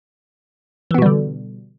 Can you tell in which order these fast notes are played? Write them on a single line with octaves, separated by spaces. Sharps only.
E3 B3 B2 G3 D3